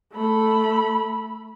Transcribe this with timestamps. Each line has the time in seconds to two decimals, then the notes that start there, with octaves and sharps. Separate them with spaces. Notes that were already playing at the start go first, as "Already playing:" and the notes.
0.13 A3 B5